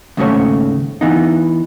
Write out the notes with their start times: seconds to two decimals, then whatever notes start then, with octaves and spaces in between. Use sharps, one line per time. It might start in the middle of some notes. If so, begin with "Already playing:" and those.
0.17 D#2 G#2 C#3 A3 F#4 C#5
1.01 E3 B3 D#4